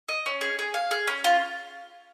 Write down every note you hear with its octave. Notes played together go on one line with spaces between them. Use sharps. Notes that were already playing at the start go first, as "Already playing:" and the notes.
D#5
C#4
G#4
G#4
F5
G#4
C#4
F4